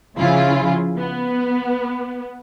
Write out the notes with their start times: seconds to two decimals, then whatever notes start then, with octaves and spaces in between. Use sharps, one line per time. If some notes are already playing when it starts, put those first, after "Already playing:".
0.17 C#3 F3 E4 F4 G#4
0.97 B3